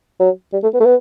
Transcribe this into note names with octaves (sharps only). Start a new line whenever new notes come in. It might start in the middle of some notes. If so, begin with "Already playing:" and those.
F#3
G3
A3
B3
A3
B3